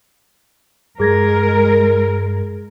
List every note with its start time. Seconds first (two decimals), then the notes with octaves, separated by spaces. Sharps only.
1.00 G2 G#3 G#4 A#4 G#6 A#6